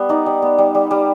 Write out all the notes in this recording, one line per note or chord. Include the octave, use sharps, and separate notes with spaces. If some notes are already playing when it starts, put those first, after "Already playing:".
Already playing: G3 B3
D#4 D5
G3
B3
G3
G3
G3